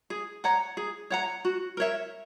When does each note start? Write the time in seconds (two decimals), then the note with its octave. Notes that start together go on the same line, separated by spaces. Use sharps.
0.10 G#4
0.44 C#5 F#5 A#5
0.77 G#4
1.10 C#5 F#5 A#5
1.45 F#4
1.77 A#4 C#5 E5